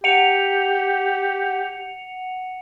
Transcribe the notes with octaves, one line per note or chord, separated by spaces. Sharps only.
G4 F#5 C#7 F7